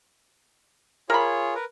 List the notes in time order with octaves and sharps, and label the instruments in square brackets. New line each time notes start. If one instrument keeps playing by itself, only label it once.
[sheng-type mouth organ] F4 G#4 C#5 [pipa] A#4 B5
[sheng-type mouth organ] A#4 B4